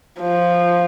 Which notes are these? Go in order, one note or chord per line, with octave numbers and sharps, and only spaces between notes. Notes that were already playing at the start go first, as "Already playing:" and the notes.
F3